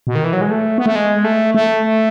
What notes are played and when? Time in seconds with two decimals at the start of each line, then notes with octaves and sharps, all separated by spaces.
0.07 B2
0.15 D#3
0.24 E3
0.33 F#3
0.41 G#3
0.51 A3
0.78 B3
0.86 A3
0.95 G#3
1.24 A3
1.55 A3